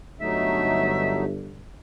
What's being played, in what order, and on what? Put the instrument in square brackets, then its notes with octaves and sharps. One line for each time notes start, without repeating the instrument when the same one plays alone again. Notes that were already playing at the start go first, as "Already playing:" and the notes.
[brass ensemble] G1 [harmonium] F#3 A3 D#4 [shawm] E5